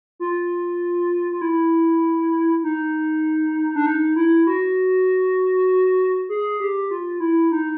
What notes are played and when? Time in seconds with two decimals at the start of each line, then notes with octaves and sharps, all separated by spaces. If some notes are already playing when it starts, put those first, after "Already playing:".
0.20 F4
1.31 F4
1.41 E4
2.63 D#4
3.75 D4
3.86 D#4
4.16 E4
4.47 F#4
6.29 G#4
6.60 G4
6.91 F4
7.20 E4
7.51 D#4